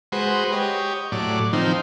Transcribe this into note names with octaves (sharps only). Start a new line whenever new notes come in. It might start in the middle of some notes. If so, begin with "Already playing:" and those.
G#3 F#4 B4 C5
G4 C#5 D#5
A2 F#3 D5
D#3 F3 C4 D#4